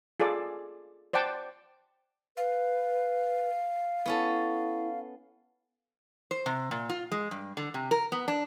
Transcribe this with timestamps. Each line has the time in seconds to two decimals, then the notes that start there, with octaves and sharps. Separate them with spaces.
0.20 F4 G#4 A4 D5
1.13 C5 D5 F#5 G5 A5
2.37 B4 F5
4.06 B3 C#4 E4 A4
6.31 C5
6.46 C3
6.71 A#2
6.89 F4
7.12 G#3
7.31 G2
7.57 D3
7.74 C3
7.91 A#4
8.12 B3
8.28 D4